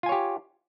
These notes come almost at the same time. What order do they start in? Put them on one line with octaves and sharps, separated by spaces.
F4 G#5 C#5 G4